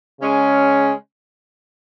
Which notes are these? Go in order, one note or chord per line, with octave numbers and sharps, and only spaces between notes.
C#3 G#3 C#4